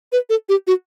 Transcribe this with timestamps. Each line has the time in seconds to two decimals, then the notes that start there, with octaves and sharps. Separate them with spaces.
0.12 B4
0.30 A4
0.49 G4
0.67 F#4